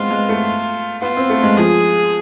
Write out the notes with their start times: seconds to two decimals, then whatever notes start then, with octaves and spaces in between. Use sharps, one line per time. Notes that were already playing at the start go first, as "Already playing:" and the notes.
Already playing: G#3 B3 C4 F4
0.10 G#3
0.29 A3
1.02 B3 F4
1.17 C4
1.30 A3
1.43 G#3
1.58 F3 G#4